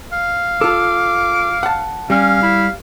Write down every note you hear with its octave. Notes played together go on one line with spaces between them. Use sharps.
F5
F4 A4 D6
F#5 A5
G3 C#4 F5
E4